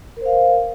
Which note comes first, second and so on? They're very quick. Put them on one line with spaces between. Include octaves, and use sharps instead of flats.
A#4 C5 F5